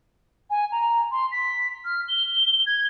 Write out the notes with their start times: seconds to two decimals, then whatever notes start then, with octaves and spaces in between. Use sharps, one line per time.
0.50 G#5
0.72 A#5
1.11 C6
1.32 B6
1.85 F6
2.08 G7
2.66 G#6